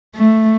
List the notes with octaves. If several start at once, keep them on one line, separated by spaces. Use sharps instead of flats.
A3